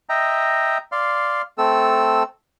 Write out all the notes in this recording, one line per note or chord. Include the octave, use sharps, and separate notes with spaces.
D#5 E5 G5 A#5
D5 F5 C6
A3 C4 A4 E6